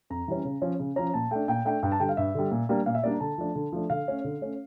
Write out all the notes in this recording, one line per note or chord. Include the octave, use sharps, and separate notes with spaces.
F2 A#5
E3 G3 C#4
C#3
F3 C#4
C#3
F3 C#4 A#5
A#2 A5
A3 D4 G5
A#2 G5
A3 D4 G5
G2 G5
A5
D3 G3 G5
F5
G2 E5
D3 G3
A#2
G3 A#3 D4
A#2 F5
E5
G3 A#3 D4 D5
A#5
D3 A5
F3 A3 D4
D3
F3 A3 D4
D3 F5
A3 C#4
D3
A3 C#4